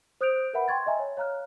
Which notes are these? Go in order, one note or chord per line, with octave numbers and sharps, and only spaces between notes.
C5 D#6 F#6 G6 D7 F7
A#4 B4 E5 F#5 B5
G5 C6 C#6 G#6 A6
D#5 E5 G#5 A#5
C#5
C#5 F5 A#5 F6 F#6